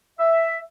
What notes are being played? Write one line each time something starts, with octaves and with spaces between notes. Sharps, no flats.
E5